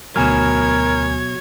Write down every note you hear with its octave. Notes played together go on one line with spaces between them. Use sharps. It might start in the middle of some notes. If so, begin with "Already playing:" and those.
D2 B2 F#3 A#4 C#5 G#5 F6 G#6